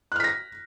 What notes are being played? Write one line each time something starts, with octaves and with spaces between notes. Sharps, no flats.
F6 F#6 A#6 B6